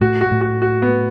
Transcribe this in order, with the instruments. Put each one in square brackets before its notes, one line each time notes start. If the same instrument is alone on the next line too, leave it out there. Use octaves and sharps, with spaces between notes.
[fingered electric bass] A2 A3 [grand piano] F#4
[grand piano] F#4
[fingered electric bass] A2 A3
[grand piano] F#4
F#4
B3